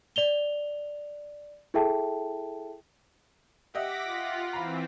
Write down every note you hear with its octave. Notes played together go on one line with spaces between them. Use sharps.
D5 F7 G7
E4 G#4 A4 E5 G5 A5
G4 D#5 E5 F#5 D6 A#6 B6
F4
E3 C4 A#5 B5